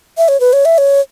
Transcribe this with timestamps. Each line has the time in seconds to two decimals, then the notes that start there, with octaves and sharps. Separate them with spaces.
0.18 E5
0.28 C#5
0.40 B4
0.53 C#5
0.65 E5
0.78 C#5